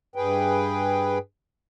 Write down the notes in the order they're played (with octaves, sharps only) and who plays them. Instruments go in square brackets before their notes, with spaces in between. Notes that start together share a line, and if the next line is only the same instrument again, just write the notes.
[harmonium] G2 G#4 B4 G5